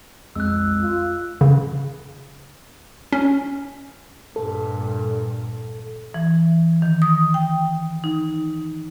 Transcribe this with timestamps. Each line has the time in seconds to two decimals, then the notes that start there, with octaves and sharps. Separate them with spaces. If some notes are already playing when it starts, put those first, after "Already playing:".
0.35 B1 F2 G#3 E6 F#6
0.81 F4
1.41 C#3
3.12 C#4
4.36 G2 A#2 A4
6.14 E3
6.82 D#3
7.02 D#6
7.34 G5
8.04 D#4